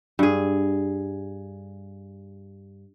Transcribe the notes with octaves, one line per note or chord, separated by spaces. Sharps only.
G2 G#4